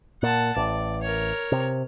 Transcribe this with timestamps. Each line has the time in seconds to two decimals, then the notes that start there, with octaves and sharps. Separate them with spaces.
0.23 A#2 F#5 A5
0.56 A1 D5
1.02 A#4 C#5
1.52 C3